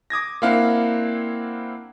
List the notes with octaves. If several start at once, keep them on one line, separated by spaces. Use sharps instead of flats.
D6 D#6 G#6 A#6
A#3 C4 D4 E4 F5 F#5